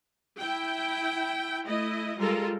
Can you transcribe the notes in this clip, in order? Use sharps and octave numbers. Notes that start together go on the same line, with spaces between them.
E4 G5
A3 E4 D#5
G3 G#3 F4 A4 A#4